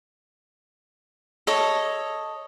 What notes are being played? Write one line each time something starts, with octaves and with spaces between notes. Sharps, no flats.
A4 C#5 D#5